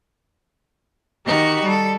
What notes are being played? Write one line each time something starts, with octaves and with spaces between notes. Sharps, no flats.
D#3 D#4 F#4 G4
G3 A4